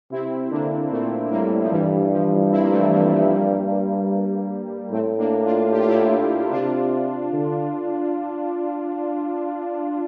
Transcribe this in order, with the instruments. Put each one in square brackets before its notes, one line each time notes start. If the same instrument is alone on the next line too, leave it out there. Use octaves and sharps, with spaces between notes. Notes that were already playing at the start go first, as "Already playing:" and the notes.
[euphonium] C3 [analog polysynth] C4 E4
[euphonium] D3 [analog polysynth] A#3 D4
[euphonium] A#2 [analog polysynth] A3 C4
[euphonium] A2 [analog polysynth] G3 A#3
[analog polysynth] F3
[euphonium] G2 [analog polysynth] E3 G3
[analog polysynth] F3
C4 E4
A#3
A3 C4
G3 A#3
F3 A3
G3 A#3
[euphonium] A2 [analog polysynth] A3 C4
[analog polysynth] A#3 D4
D4 F4
G4
F4
E4 G4
[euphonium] C3 [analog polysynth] D4 F4
[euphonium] D3